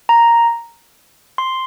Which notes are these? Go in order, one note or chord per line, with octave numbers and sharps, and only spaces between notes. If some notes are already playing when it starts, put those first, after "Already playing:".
A#5
C6